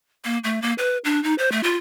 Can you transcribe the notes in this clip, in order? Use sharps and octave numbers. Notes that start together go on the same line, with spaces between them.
A#3
A3
A#3
B4
D4
D#4
C5
A3
F4